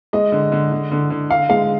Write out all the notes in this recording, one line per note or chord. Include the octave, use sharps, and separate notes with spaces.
G#3 D#5
D3
D3
D3
D3
D3
D3 F5
G#3 F5